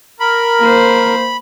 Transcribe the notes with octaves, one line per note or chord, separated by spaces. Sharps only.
A#4 B5
A#3 C5